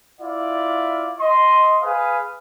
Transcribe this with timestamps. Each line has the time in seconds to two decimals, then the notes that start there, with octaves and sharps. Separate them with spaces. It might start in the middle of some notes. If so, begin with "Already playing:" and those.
0.20 E4 F4 D5 F5
1.20 D#5 C6
1.82 G#4 B4 F5 D#6